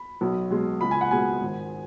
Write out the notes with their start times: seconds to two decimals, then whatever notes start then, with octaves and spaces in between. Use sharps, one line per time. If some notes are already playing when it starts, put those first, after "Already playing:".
Already playing: B5
0.21 B1
0.51 B2 G#3
0.81 C#2 B5
0.91 G#5
1.01 F#5
1.11 B2 G#3 G#5
1.41 G#1